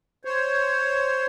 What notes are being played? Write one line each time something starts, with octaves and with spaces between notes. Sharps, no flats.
C5 C#5